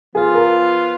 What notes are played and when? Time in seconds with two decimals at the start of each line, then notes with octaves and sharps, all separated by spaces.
0.15 F3 B3 F4 G#4
0.34 A#4